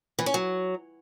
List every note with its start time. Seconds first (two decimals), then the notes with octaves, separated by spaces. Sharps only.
0.19 E3
0.26 C#4
0.34 F#3